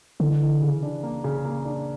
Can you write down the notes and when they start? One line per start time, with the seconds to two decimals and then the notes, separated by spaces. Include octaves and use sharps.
0.19 D3 E3
0.40 E3
0.61 C#3
0.83 D4
1.03 A#3
1.24 C#3
1.45 A#3
1.65 D4